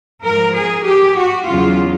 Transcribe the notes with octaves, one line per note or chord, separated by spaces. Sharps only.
G#2 F3 A#4
G#4
G4
F#4
E2 C#3 F#3 F4